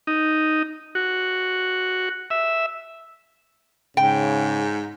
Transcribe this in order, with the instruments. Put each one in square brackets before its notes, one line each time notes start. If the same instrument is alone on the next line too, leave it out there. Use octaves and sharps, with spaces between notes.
[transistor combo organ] D#4
F#4
E5
[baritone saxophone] G#2 [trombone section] C#3 [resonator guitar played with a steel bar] G5